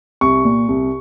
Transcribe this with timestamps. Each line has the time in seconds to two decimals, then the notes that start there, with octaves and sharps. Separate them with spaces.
0.21 C2 C#6
0.45 A#2
0.69 C2